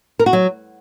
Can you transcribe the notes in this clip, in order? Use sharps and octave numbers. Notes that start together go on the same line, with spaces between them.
A#4
F#4
F#3